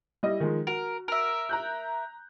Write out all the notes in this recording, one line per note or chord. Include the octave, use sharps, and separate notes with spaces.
G3 E4 D#5
D#3 F3 G#3
F#4 A#4
A#4 E5
A#5 F#6 G6